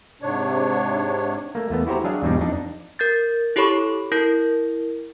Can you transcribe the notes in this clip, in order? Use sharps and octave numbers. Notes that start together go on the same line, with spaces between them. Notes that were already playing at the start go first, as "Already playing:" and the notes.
G#2 C3 D4 C#5
A3 A#3
E2 A3 B3
E4 F#4 G4 C5 A#5
F#3 D4 G#4 E5 F5
E2 G#2 B2 G3 D4 D#4
F2 D4 D#4
A#4 G6 A6
E4 G4 A4 C#5 B5 C#6
E4 A#4 G6 A#6